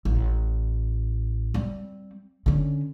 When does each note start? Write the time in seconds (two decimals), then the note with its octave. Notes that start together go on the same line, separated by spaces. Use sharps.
0.05 A1
1.54 G3 C4
2.46 D3 C#4